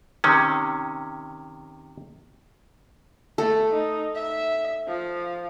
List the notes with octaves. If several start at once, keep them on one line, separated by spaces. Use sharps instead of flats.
C3 D#3 C#4
A3 A4
D#4
E5
F3